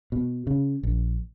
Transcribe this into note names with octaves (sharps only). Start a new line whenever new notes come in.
B2
C#3
A#1